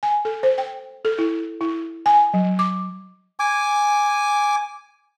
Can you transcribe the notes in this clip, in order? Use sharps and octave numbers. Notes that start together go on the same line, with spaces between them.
G#5
A4
C5
G5
A4
E4
E4
G#5
F#3
D6
G#5 D6